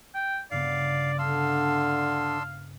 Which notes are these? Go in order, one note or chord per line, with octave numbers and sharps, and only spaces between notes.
G5
G2 C#3 B3 D5 F5
D3 D4 F5 C6 E6